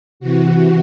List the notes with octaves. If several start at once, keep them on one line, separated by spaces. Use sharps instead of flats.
C3 E3 F#4